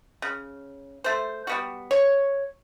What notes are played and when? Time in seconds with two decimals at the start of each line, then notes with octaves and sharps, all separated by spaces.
0.22 C#3
1.04 A3 C5
1.47 G3 B3 F#4
1.91 C#5